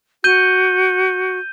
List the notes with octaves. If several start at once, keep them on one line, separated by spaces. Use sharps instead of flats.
F#4 G6 D#7 G7